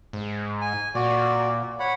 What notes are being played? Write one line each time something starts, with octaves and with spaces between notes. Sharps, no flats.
G#2
G#5
A#2 F#4 D5
C#5 F#5 B5